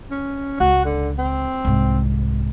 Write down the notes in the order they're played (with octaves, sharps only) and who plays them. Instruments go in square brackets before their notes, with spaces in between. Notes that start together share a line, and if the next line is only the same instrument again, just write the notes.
[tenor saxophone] C#4
[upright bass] C#2 [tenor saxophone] F#4
[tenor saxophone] D3
C4
[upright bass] C2 G#2